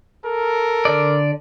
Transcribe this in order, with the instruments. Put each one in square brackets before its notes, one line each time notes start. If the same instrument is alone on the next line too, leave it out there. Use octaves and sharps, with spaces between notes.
[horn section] A4 A#4
[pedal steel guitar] D3 D5